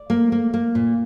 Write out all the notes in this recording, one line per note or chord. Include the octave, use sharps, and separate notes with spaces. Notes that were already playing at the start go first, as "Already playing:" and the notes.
Already playing: D5
A#3
A#3
A#3
A#2